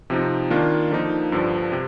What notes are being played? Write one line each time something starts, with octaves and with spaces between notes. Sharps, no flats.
C3 F3 C4 D#4
D#3 A#3 D4 F4
D3 F3 A#3 D#4
G2 D3 F3
C3